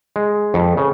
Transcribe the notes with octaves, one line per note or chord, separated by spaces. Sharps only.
G#3
F2
C#3